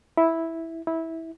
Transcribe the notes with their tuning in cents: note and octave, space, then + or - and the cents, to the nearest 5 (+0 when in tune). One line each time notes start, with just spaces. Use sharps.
E4 -5
E4 -15